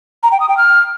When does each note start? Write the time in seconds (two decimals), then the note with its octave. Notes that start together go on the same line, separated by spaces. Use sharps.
0.23 A#5
0.32 G5
0.40 D#6
0.49 G5
0.57 F6